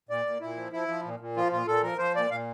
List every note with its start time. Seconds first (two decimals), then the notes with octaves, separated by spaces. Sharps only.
0.09 A#2 D5
0.26 A#2
0.41 A#2 E4
0.57 F3
0.72 F3 E4
0.88 F3
1.05 A#2
1.20 A#2
1.36 F3 F4
1.51 A#2 F4
1.67 A#2 A4
1.83 F3 A#4
1.98 F3 C5
2.15 A#2 D5
2.31 A#2 F5